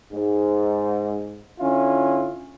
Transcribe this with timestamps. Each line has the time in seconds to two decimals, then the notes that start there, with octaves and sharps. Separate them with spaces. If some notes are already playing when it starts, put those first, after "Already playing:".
0.12 G#2
1.59 D3 C#4 E4 F4